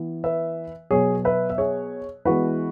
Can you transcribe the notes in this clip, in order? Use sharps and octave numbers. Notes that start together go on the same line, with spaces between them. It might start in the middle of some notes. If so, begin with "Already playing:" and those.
Already playing: E3 B3
B4 E5
B2 F#3 B3 G#4 C#5
B4 E5
E5
G#4 C#5
E3 G#3 B3 F#4 B4